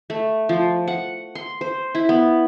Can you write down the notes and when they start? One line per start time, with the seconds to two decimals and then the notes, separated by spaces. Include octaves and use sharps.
0.10 A3
0.49 F3
0.88 F#5
1.35 C6
1.61 C5
1.95 E4
2.09 B3